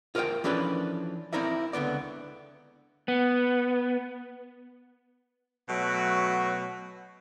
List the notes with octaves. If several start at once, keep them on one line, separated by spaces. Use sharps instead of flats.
F4 A#4 C5 D#5 G5
E3 F3 C#4 D4 A4 B4
C4 D#4 E4 A#4 D5 E5
C#2 D3 B3 D5
B3
B2 F#3 A3 F#4